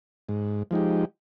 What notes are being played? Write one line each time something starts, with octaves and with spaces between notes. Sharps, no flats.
G#2
F3 G#3 D#4 G4